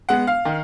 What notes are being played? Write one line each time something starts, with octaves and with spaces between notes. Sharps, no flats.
G#3 B3 F#5
F5
D#3